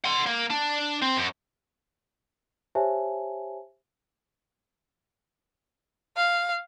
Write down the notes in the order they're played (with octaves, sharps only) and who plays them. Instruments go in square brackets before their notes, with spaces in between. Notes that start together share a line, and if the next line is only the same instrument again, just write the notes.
[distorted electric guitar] F#5 C6
A#3
D4
C4
F#2
[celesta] G4 C5 C#5 E5 G#5 A5
[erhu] F5